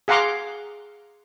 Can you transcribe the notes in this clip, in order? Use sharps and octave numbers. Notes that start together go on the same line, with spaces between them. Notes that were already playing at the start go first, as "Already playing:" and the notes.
G#4 F5 F#5 A#5 C6 D6